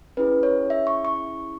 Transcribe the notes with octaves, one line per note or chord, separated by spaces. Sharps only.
C#4 E4 G#4 B4
C#5
E5
C#6
C#6